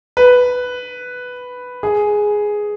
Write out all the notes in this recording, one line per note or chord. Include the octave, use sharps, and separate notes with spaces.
B4
G#4